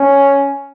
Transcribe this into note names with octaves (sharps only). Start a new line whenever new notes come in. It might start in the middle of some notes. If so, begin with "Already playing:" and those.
Already playing: C#4